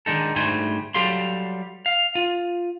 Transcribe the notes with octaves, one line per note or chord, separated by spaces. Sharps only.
D3 D#3 G#3 D#4 A4
D2 G#2 G3 A3 C5 G#5
F#3 G3 G4 A4 F5 C6
F5
F4